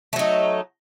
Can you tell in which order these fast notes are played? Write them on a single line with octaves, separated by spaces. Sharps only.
A3 F#3 D#4